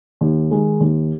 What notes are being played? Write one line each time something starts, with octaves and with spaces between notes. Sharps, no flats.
D#2
D#3 G#3 D#4
D#2